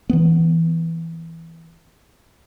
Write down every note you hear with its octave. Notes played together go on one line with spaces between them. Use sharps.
E3 B3